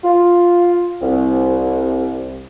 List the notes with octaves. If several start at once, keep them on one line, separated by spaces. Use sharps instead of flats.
F4
C2